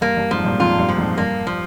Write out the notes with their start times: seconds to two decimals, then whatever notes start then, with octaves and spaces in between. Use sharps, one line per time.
0.01 G2 A#3
0.17 G2
0.31 F2 G#2 F3
0.45 G2 A#2
0.59 F2 G#2 F4
0.79 G2
0.89 F3
0.98 F2 G#2
1.17 G2 A#3
1.47 F3